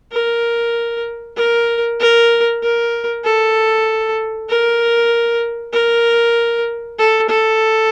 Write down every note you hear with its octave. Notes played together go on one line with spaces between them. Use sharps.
A#4
A#4
A#4
A#4
A4
A#4
A#4
A4
A4